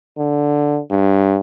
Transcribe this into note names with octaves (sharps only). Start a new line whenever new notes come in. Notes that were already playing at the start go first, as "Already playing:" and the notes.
D3
G2